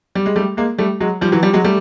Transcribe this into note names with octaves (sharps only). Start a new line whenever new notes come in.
G3
G#3
G3 A3
G#3 A#3
G3 A3
F#3 G#3
F3 G3
E3 F#3
F3 G3
F#3 G#3
G3 A3